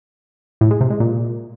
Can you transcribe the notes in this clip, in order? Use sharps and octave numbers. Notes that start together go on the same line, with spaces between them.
A2
G#3
C3
G#3
A#2